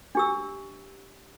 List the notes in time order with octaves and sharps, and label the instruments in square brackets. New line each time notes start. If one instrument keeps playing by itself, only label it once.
[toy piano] D4 G4 E6